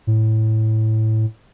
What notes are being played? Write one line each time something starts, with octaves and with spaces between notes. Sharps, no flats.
A2